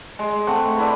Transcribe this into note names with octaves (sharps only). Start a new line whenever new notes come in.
G#3
A3 C4 F#5
D4 E4 B4